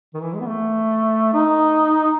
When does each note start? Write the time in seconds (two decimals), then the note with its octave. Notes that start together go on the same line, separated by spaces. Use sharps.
0.14 D#3
0.22 E3
0.33 G#3
0.40 B3
0.47 A3
1.33 D#4